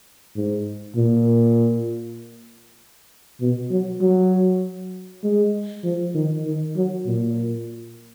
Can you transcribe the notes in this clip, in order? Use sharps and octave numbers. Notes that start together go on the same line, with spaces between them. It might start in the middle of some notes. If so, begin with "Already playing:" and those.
G#2
A#2
B2
F#3
F#3
G#3
F3
D#3
D#3
F#3
A#2